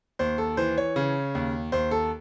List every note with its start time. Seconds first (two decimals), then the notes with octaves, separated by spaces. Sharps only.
0.19 D#2 C5
0.38 A4
0.57 E3 C5
0.78 C#5
0.96 C#3
1.35 D#2
1.72 D#2 C5
1.91 A4